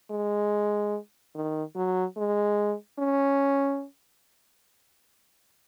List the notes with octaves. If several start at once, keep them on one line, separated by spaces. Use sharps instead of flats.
G#3
D#3
F#3
G#3
C#4